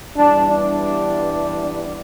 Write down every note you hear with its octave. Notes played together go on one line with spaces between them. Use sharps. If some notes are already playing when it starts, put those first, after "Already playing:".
G2 E3 G3 B3 D4
D4